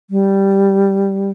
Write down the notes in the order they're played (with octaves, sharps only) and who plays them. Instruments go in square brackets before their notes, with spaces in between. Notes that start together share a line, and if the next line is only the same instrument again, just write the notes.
[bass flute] G3